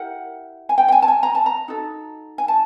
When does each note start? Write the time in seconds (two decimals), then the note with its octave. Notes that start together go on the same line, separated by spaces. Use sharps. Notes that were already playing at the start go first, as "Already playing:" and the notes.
Already playing: E4 G4 A#4 F#5
0.69 G#5
0.78 G5
0.88 G5
0.92 G#5
1.02 A5
1.08 G#5
1.23 A#5
1.35 A5
1.46 A#5
1.68 D#4 F#4 A4
2.38 G#5
2.48 A5